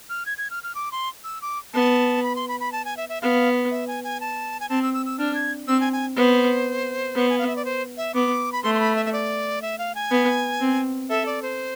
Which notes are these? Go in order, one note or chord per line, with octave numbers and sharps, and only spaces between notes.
F6
G#6
G#6
F6
F6
D6
C6
E6
D6
B3 A5
B5
C6
B5
B5
A5
G#5
E5
E5
B3 F5
E5
G#5
G#5
A5
G#5
C4 A5
E6
E6
E6
D4 F6
G#6
C4 E6
G#5
G#5
B3 C5
B3
G#5
F5
E5
D5
C5
E5
B3 D6
B5
A3 C6
C6
B5
E5
E5
D5
E5
F5
G#5
B3
C4
A4 E5
D5
C5